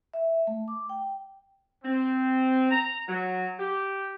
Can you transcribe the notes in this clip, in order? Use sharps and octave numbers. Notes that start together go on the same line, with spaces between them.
E5
A3
D6
G5
C4
A#5
F#3
G4